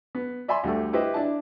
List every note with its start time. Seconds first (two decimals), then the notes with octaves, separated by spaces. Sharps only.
0.15 B3
0.48 D5 E5 G#5 B5 C6
0.64 D2 G3 A3
0.93 E4 G4 B4 C5 D#5 E5
1.14 D4 E4 A5